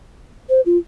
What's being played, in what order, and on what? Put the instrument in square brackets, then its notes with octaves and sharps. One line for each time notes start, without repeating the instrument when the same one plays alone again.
[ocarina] C5
F4